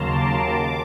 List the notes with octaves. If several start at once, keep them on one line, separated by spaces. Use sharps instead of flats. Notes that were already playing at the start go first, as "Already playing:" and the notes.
Already playing: D#2 C#3 F#3 A#3 A5 A#5 C6
D6
D#2 D6